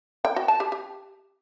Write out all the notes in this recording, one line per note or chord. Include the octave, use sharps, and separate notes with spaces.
G5
F#4
A5
G4
G4